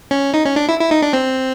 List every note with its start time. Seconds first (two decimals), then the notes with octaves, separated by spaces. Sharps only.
0.11 C#4
0.34 D#4
0.45 C#4
0.56 D4
0.69 E4
0.80 E4
0.91 D#4
1.02 D4
1.13 C4